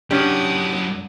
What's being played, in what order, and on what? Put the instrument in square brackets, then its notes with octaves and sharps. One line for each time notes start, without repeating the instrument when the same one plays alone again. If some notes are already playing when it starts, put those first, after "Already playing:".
[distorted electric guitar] F#2 E4 [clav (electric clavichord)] C#4 G4 [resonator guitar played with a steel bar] D4 [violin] F#5 D#6